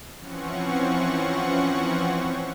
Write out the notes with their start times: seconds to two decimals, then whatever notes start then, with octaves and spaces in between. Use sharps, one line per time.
0.17 E3 F3 C4 C#4 F#5 C#6